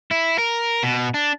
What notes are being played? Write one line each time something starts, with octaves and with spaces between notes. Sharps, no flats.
E4
A#4
B2
D4